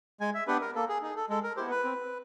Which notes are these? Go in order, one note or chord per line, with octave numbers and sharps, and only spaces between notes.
G#3 G#5
E5
B3 D4 G4 B4
A#4
A#3 A4
G#4
D#4 G#4
A4
G#3 A4
A#4
B3 E4 G4 C5
B4
C4